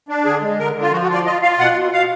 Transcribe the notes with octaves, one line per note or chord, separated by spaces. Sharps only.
D4
D3 G#4
G#3
D3 A#4
D3
F4
F3 F#4
F#4
F4 D5
F4 D#5
F4 F5
B2 F#5
B2
B2 F5